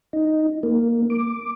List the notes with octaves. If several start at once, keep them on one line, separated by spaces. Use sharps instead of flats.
D#4
A#3
D6